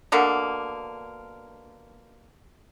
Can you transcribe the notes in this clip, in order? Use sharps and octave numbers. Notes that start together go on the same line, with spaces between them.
B2 D3 A#3